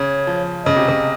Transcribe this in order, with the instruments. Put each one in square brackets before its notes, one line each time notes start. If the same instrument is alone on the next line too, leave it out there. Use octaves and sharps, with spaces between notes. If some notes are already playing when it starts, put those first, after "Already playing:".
Already playing: [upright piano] C#3 [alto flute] C#5
[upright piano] F3
[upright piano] C#3 [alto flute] D#5
[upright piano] C3
C#3